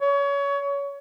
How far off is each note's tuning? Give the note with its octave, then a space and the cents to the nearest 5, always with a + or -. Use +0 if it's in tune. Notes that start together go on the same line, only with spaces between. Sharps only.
C#5 +25